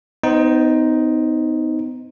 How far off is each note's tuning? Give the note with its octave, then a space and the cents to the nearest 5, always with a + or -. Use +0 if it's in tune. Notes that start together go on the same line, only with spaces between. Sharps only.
B3 +40 D#4 +5 C5 +5